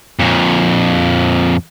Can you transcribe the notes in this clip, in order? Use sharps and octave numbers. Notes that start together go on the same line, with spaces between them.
F2 A#2